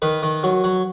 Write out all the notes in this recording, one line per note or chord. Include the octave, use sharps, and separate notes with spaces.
D#3 B4
D#3
F#3
F#3